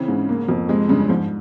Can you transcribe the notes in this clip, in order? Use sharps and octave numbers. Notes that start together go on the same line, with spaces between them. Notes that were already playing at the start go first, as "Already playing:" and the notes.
Already playing: C#3 E3 C4
G#2
A#3
F2
C3 G#3
G2 C#3
G#2 F3